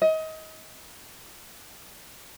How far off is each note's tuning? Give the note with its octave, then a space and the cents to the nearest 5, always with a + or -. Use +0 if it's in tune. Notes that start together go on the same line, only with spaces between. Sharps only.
D#5 +25